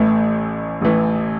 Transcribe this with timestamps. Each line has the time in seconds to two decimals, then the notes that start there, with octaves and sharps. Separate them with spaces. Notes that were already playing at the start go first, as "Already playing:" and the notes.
Already playing: A1 A2 E3 A3
0.81 A1 A2 E3 A3